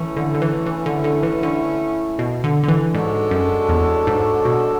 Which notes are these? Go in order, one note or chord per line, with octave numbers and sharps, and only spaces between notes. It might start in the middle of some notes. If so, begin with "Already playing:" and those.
Already playing: E3 A3 C#4 E4
D3
D3
E3
E3
D3
D3
E3
D3
B2
D3
D3
E3
G#2 G#3 D4 F#4 A4 C#5
F#2
E2
G#2
B2